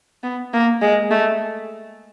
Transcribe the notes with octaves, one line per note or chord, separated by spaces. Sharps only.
B3
A#3
G#3
A3